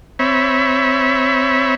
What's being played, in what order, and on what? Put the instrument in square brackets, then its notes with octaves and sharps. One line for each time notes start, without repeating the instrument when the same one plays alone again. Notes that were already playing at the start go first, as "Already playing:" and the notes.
[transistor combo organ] C4 C#5 E5 B5